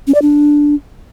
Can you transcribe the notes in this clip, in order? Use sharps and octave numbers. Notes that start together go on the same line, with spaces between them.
C#4
D5
D4